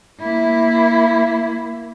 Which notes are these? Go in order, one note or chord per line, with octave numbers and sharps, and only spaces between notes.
A#3 E4